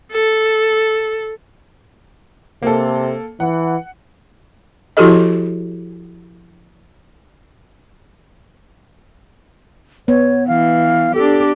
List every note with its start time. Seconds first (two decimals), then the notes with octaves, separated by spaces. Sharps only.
0.12 A4
2.62 C3 A#3 A4
3.40 E3 F#5
4.97 F3 E4 F#4 G4 A4 D#5
10.08 B3 C#5
10.48 E3 F5
11.15 D4 G4 A4